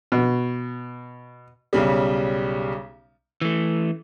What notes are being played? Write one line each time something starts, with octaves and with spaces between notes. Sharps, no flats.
B2
B1 C#3 G3
E3 A3